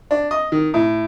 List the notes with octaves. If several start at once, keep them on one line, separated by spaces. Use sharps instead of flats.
D4
D#5
D#3
A2